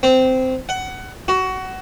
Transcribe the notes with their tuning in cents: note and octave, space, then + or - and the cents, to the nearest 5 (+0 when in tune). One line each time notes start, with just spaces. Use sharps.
C4 -15
F#5 +20
F#4 +20